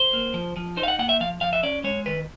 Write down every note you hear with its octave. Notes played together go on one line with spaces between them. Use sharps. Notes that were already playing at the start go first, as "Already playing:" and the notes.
Already playing: C5
A#3
F3
F3
D#4 C5
F5
F#5
A#3 F#5
E5
F3 F5
F3 F5
E5
C#4 D5
G#3 C#5
D#3 B4